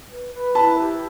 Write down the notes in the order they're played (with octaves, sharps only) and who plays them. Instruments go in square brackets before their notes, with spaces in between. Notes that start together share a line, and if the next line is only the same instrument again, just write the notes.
[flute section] B4
B4
[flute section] E4 [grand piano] A5 B5
[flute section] G4